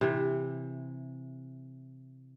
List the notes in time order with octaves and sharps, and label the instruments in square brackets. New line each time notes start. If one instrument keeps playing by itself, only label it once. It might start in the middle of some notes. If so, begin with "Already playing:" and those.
[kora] C3 E3